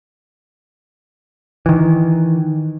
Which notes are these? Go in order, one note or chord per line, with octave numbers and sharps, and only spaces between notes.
D#3 E3